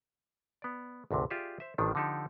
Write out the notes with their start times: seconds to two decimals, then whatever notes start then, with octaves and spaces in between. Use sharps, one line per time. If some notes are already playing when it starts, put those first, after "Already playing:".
0.62 B3 D5
1.11 G#1 D2 A2 C3
1.30 F4 G4 G#4 D5 E5
1.60 C5 E5
1.78 A1 A2 D#3 F3 D4
1.95 D3 F3 D#4 G4 A4